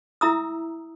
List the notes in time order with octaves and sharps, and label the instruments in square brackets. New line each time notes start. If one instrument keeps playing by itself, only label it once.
[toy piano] E4 E5 A#5 D#6 E6